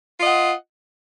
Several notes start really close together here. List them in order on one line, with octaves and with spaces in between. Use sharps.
F4 D#5 F#5